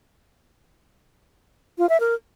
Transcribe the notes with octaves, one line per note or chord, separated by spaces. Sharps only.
F4
E5
A#4